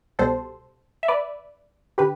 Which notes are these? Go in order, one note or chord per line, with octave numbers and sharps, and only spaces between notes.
C2 B2 G3 A4 C5
E5
B4 D5
D3 G4 B4